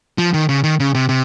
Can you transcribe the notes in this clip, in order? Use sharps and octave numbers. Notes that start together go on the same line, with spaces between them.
F3
D#3
C#3
D#3
C#3
C3
C3